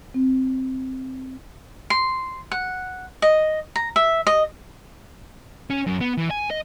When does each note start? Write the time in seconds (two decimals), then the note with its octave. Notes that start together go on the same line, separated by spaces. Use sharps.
0.14 C4
1.90 C6
2.51 F#5
3.22 D#5
3.76 A#5
3.96 E5
4.27 D#5
5.70 C#4
5.87 F#2
6.01 B3
6.18 E3
6.30 G#5
6.51 D#5